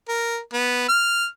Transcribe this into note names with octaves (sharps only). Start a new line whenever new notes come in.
A#4
B3
F6